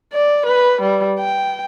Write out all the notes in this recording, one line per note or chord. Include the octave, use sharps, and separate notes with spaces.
D5
B4
G3
G5